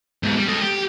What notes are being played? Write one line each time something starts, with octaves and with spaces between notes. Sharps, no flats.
G#2 B2
G3
A4 D#5
G4